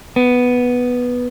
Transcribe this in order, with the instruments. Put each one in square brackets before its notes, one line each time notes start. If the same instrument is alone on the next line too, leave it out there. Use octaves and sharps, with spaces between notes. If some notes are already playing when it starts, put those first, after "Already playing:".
[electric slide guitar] B3